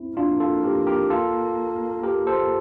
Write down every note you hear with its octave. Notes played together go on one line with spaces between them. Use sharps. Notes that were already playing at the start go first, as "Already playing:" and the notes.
Already playing: C4 E4
A#3 D4 F4
F4 A4
G4 A#4
G4 A#4
F4 A4
G4 A#4
A4 C5